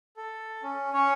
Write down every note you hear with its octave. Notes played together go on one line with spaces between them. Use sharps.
A4
C#4
C#4 C#5